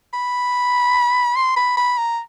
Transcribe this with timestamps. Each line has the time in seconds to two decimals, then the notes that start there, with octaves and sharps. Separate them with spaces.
0.14 B5
1.36 C6
1.56 B5
1.77 B5
1.98 A#5